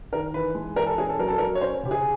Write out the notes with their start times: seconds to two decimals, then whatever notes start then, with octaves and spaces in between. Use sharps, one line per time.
0.12 D#3 A#4
0.34 E3 B4
0.55 G#3
0.76 E3 A#4
0.87 A4
0.98 C#4 G#4
1.09 A4
1.19 F#3 A#4
1.28 A4
1.38 A#4
1.41 F#3
1.55 C#5
1.61 C#4 C5
1.83 C#3 G4
1.91 G#4